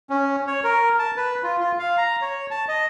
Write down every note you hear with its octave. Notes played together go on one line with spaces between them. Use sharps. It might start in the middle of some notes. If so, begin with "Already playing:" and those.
C#4
C#5
A#4
A5
B4
F4
F4
F5
A#5
C#5
A5
D#5